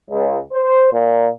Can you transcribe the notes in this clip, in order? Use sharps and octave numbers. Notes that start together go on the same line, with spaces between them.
C#2
C5
A#2